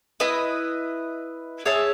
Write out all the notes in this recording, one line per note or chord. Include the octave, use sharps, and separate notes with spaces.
E4 B4 D#5
G#4 C#5 E5 A5